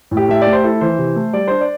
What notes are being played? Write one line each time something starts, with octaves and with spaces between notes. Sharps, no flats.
A2
G4
A3 E5
D5
A3
C5
E4 A4
E3 C5
C3
A3
G3 D5
D4 C5
D5